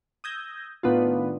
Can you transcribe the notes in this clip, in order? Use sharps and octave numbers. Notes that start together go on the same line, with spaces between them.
D#6 E6 G6 G#6 A#6
A2 D#3 B3 D4 F4